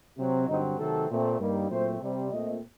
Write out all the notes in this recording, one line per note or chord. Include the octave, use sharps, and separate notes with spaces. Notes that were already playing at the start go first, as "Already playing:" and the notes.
C3 F#3 C4
G2 D3 F#3 C4 D#4
C3 D#3 F#3 A3 C4 A4
A#2 A3 C4
G2 D#3 G3 A#3
A#2 F#3 A3 C4 C5
C3 G3 C4
A#2 A3 C4 D#5